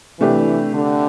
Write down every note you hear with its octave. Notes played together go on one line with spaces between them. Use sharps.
C3 E3 A3 D4 G4
D3